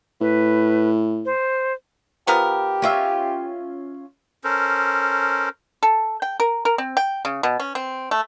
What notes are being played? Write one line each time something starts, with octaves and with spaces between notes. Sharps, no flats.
A2 B4
C5
F3 B3 G4 A#4
C#4 F4 E5
C#4 A4 A#4 C5
A4
G5
A#4
A#4
C4
G5
C#3
B2
C#4
C4
A3